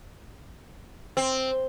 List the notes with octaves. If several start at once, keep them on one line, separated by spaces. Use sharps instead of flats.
C4